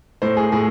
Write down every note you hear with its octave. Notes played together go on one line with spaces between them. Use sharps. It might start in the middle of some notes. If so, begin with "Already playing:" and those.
A2 C5
G#4
A2 G#4